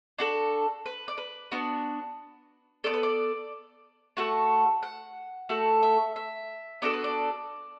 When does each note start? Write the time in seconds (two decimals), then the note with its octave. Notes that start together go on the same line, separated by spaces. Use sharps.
0.19 D4 F#4 A4
0.86 B4
1.08 D5
1.18 B4
1.52 B3 D4 F#4
2.84 B3 F#4 A4 D5
2.94 B4
3.03 D5
4.17 A3 F#4 A4 F#5
4.83 F#5
5.49 A3 F#4 A4
5.83 E5
6.16 E5
6.82 B3 D4 F#4 A4 D5
6.93 B4
7.04 D5